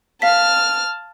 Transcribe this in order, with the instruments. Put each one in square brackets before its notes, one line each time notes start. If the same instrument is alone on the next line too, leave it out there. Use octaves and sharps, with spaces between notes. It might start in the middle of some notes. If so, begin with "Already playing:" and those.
[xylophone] F5 B6 [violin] A5 F6